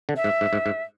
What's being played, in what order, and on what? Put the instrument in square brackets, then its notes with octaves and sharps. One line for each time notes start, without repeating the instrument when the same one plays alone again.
[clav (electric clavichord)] D3
[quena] E5
[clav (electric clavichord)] G#2
G#2
G#2
G#2